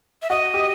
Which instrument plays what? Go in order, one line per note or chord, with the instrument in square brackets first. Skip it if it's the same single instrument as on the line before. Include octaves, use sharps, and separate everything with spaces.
[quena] E5
[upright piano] F#4 [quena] D#5
[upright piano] G4